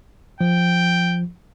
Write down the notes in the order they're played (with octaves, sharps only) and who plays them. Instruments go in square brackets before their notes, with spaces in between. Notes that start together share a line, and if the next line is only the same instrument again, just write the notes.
[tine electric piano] F3 [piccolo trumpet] G5